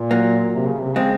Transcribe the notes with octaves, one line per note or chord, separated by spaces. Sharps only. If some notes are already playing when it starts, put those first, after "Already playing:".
Already playing: A#2
F#3 A#3
C3
C#3
C3
C#3 G#3 C4